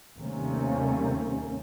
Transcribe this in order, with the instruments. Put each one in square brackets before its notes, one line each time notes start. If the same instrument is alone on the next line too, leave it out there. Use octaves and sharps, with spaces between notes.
[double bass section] D#2 C3 G3 A3 A#3 C#4